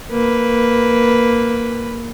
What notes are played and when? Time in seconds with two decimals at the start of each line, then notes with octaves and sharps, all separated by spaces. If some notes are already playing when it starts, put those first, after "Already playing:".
0.11 A#3 B4